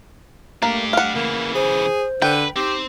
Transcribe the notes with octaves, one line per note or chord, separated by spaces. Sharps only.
A3 A#3 D4 G4
F5 F#5
C#3 E3 A#3
G#4 C5
D3 B4 G5
C4 D#4 G4 C5